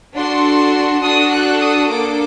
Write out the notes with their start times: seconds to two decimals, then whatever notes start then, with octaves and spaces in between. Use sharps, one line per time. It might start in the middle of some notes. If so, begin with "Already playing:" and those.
0.16 D4 F#4 A4 C6
1.03 D4 F#4 A4 D#6
1.33 F#6
1.62 D#6
1.91 A#3 D4 A4 D6